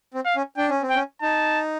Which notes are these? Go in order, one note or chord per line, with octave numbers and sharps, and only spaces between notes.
C4
F5
C#4
D4 G5
C#4
C4
G5
C#4
D#4 A5